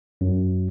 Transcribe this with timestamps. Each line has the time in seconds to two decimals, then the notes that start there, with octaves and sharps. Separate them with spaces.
0.21 F#2